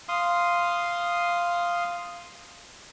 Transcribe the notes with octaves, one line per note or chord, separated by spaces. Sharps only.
F5 C6 D#6